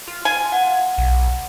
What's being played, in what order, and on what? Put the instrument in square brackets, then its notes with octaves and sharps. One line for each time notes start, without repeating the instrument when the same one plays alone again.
[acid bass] F4
[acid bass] F4 [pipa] G#5
[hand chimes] F#5
[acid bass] B1